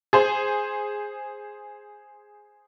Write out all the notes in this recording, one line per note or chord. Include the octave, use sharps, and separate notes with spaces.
G#4 C5